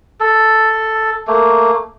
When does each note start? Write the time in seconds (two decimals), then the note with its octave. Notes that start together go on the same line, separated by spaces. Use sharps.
0.20 A4
1.27 A3 A#3